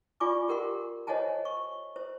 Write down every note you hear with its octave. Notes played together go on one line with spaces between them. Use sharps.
F4 D5 G#5 C#6 D6
G4 A#4 F#5 C6
C5 C#5 D#5 F#5 G#5 A5
C#6
C5